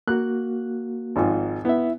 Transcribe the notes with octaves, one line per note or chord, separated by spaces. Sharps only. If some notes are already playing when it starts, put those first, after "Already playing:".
A#3 F#4 F#6
G#1 G#2 F3
B3 E4 E5